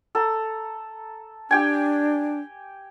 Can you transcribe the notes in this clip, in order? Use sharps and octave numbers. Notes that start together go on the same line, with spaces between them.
A4 A#5
D4 G4 G5 G#5